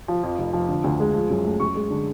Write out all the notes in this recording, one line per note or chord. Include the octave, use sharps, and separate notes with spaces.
F3
F2
F1
F3
D3
D2
G#3
F3
F#2
A3
F#2 C#6
G#3
D3